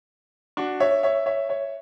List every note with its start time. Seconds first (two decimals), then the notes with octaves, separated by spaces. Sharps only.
0.57 D4 F#4
0.80 C#5 E5
1.03 C#5 E5
1.26 C#5 E5
1.49 C#5 E5